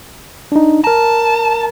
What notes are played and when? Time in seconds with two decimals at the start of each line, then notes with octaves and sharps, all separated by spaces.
0.52 D4 D#4
0.84 A#4 A5 A#5